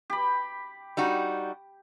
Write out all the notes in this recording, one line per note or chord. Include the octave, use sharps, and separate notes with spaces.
G4 B5
G3 D#4 F#4